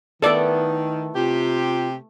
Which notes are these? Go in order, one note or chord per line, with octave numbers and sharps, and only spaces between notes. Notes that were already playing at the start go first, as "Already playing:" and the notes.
D#3 A3 B3 E4 A4 D5
C3 F4 G4